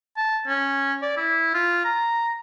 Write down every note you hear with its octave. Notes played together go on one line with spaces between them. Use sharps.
A5
C#4
D5
E4
F4
A#5